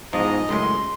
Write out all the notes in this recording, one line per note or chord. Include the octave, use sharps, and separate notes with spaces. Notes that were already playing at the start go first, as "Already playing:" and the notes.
E2 G#2 F3 D#5 A#5
C#2 F#2 A2 G#3 C6